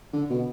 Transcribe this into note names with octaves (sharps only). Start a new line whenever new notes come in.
D3
B2